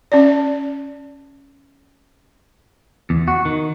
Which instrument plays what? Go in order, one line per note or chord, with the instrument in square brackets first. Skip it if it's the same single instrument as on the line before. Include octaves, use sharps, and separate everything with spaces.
[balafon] C#4 D5
[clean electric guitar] E2
F#4
D#3